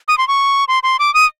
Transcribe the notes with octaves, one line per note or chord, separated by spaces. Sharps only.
D#6
C6
C#6
C6
C6
D6
D#6